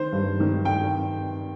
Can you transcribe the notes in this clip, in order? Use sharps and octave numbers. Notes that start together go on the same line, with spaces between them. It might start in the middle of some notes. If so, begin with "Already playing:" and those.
Already playing: D#3 C5
G2
D#3
G5